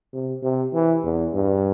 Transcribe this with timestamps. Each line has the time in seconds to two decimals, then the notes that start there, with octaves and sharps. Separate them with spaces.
0.13 C3
0.43 C3
0.74 E3
1.04 E2
1.34 G2